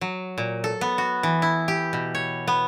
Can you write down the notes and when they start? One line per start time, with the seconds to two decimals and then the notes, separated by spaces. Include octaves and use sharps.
0.01 F#3
0.38 A#2
0.64 A4
0.81 B3
0.98 F#4
1.23 E3
1.42 E4
1.68 G4
1.93 B2
2.15 C#5
2.47 B3